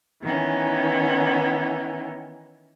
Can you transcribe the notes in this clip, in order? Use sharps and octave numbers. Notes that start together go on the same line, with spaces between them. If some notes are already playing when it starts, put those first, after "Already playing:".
D#3 E3 B3 C#4